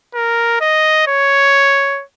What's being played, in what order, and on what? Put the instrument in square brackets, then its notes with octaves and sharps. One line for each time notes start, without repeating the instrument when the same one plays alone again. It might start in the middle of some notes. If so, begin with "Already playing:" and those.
[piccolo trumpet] A#4
D#5
C#5